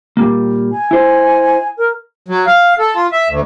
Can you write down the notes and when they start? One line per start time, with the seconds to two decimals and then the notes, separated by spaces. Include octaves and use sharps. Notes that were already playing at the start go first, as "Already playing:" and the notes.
0.17 A#2 G3 A#3
0.71 G#5
0.91 E4 C5
1.77 A#4
2.28 F#3
2.47 F5
2.79 A4
2.95 F4
3.12 E5
3.29 D2